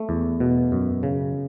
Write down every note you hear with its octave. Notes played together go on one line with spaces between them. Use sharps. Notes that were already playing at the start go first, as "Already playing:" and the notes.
Already playing: A3
E2
B2
F#2
C#3